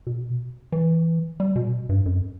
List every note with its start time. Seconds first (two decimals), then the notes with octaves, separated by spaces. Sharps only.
0.07 B2
0.72 E3
1.40 G3
1.56 B2
1.89 G2
2.06 F#2